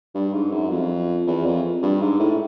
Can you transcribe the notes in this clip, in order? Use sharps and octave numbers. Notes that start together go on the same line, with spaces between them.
G2
G#2
F#2
F2
E2
F2
G2
G#2
A2